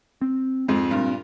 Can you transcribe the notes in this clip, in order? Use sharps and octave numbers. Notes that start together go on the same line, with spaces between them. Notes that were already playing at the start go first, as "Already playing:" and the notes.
C4
F2 G#2 C4
G2 A#2